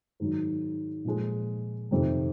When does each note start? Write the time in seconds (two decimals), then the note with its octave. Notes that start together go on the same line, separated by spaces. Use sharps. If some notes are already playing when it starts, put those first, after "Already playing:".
0.20 G#2 D#3 F#3
1.05 A#2 F3 G#3
1.91 F2 C3 D#3